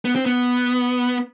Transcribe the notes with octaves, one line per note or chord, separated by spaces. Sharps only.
B3
C4
B3